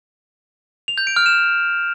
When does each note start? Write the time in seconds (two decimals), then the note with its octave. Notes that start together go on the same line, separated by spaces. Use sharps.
0.88 F7
0.98 G6
1.07 D7
1.16 F6
1.26 E7